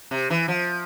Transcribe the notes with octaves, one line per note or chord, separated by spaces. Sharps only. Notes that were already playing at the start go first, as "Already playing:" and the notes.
C3
E3
F3